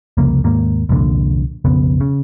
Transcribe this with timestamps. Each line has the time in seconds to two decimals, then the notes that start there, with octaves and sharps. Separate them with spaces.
0.17 C2 F2 C#3 A#3
0.44 D#2 G#2 A#3
0.89 C2 F2 A#2 D3
1.65 B1 F2 C#3 B3
2.00 C#3